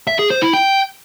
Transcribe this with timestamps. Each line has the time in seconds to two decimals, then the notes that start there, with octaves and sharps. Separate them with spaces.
0.07 E5
0.19 G#4
0.30 C5
0.42 E4
0.53 G5